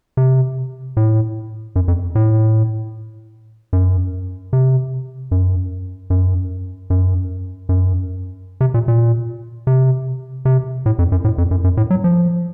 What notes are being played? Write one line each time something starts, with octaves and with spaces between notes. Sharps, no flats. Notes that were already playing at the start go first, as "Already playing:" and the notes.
C3
A2
F#2
F2
A2
F#2
C3
F#2
F#2
F#2
F#2
C3
A#2
A#2
C3
C3
A2
F2
F#2
A2
F2
F#2
F#2
A2
F#3
F3